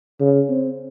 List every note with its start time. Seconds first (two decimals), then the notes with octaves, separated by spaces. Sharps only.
0.20 C#3
0.50 C4